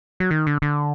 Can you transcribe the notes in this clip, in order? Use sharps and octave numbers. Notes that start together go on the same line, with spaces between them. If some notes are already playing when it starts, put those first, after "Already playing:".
F#3
D#3
D3
D3